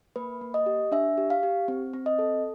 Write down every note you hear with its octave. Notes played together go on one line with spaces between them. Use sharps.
A#3 B4
A#3
D#5
G4
D4 E5
G4
F5
G4
C4
C4
D#5
A4